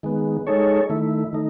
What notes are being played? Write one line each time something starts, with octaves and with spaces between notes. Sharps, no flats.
D#3 G#3 B3
G#3 D#4 A4 C#5
D#3 A3 E4
D#3 A3 D#4